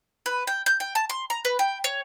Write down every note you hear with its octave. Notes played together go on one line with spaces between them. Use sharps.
B4
G5
G6
G5
A5
C6
A#5
B4
G5
C#5